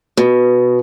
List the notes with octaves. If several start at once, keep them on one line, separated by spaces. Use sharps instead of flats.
B2